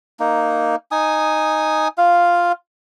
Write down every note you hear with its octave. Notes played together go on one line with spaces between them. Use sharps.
A#3 D#4
D#4 G#5 D#6
F4 F5